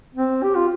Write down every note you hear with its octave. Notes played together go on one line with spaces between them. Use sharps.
C4
G4
F4